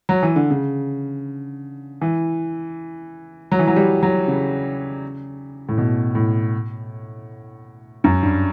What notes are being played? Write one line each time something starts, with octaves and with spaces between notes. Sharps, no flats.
F#3
E3
D3
C#3
E3
F#3
E3
F#3
G3
F#3
C#3
A2
B2
A2
F#2
G2